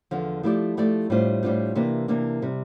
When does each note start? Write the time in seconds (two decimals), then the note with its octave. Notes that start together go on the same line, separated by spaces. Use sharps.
0.11 E2 D3 F3
0.43 F3 A3 E4 G4 D5
0.77 F3 A3 E4 G4 D5
1.10 A2 G3 D4 F4 C5
1.43 A2 G3 D4 F4 C5
1.75 C3 E3 A#3 D4
2.08 C3 E3 A#3 D4
2.42 C3 G3